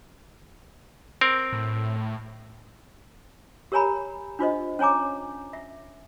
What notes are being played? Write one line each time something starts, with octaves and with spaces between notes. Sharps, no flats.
C4 A#4
A2
G4 A#4 C#5 G#5 A#5 B5
D4 F4 C5 D#5
C#4 C#5 G#5 A#5 D6
E5